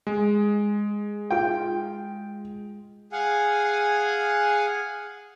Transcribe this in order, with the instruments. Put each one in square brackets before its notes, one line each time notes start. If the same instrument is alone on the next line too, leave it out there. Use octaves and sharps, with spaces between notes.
[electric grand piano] G#3
[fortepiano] F4 G5
[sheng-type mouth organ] G#4 F5 F#5 G#5